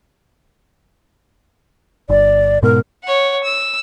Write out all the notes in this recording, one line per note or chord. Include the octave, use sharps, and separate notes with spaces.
G1 D5
G#2 B2 A#4
C#5 F#5
E6